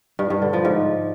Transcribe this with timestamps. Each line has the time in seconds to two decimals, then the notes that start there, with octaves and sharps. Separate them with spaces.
0.19 G2
0.30 G2
0.42 D3
0.53 F3
0.65 G#2